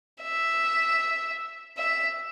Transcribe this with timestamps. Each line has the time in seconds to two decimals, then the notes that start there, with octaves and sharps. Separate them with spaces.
0.23 E5
1.78 E5